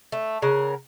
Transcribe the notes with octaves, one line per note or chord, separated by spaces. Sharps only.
A3
C#3 A#4 F#5